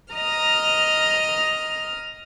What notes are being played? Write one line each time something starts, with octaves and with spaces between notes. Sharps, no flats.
D#5 A#5 D#6 F6